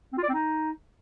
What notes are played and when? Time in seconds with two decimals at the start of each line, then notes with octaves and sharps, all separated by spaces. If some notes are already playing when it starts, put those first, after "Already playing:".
0.12 C4
0.18 F4
0.23 D5
0.29 C4
0.34 D#4